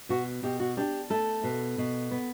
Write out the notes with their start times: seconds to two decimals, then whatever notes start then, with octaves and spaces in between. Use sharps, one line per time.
0.09 B2 F#4
0.43 B2 G4
0.60 F#4
0.77 D4 G4
1.10 A3 A4
1.44 B2
1.78 B2
2.11 B3